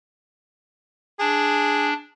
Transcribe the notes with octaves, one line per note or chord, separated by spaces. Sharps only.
D4 G#4